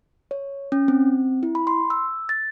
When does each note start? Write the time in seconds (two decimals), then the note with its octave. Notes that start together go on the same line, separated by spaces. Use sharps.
0.31 C#5
0.72 C#4
0.88 C4
1.43 E4
1.55 B5
1.67 C6
1.90 E6
2.29 A6